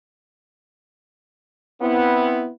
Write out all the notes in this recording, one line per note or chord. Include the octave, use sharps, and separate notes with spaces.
B3 C4 E4